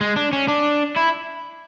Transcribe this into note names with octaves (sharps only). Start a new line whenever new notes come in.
G#3
D4
C#4
D4
E4